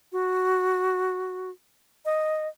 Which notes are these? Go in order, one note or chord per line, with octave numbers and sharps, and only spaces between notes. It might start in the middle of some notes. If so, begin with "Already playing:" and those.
F#4
D#5